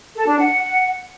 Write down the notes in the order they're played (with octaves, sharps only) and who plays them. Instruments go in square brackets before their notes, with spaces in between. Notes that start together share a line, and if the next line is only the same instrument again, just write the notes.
[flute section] A4
D4
F#5